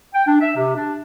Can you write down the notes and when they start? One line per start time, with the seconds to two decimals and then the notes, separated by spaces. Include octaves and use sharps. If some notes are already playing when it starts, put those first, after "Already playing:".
0.14 G5
0.27 D4
0.41 E5
0.55 C3
0.76 D4